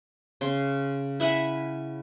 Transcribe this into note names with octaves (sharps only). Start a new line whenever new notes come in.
C#3 C6
E4 E5 F#5 G#5